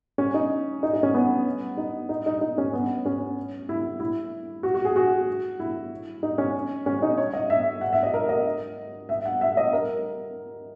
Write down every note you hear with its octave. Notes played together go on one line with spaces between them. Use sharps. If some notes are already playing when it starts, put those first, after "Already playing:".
C#4
D#4
D#4
D#4
C#4
B3
D#4
D#4
D#4
D#4
C#4
B3
C#4
E4
E4
F#4
F#4
G#4
F#4
E4
D#4
C#4
C#4
D#4
C#5
D#5
E5
F#5
E5
D#5
A#4
D#5
E5
F#5
E5
D#5
A#4